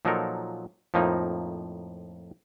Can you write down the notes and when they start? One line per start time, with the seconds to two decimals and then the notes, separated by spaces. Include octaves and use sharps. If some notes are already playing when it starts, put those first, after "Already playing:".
0.05 A#2 F3 F#3 D#4 A4 A#4
0.94 F2 A2 F3 A#3 D#4